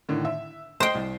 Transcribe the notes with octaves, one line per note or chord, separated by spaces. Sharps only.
A2 D3 D#3
E5
C5 D#5 G5 C6 C7
C2